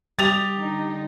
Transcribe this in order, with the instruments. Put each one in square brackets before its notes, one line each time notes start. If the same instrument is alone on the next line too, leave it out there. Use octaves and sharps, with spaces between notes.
[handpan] G3 [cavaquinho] G4 D#6 [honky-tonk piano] A6 F7
[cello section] D3 D#4